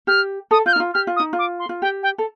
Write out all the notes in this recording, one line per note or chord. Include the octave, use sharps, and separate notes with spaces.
G4 F6
A4 D#6
F4 G6
F6
D#4
F4
G4 F6
F4
D#6
D#4
F4
D6
C6
F4
G4 G5
G5
A4